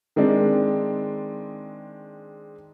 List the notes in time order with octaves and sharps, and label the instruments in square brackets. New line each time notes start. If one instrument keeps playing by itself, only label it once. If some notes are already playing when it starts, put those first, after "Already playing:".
[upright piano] D#3 G#3 C4 D4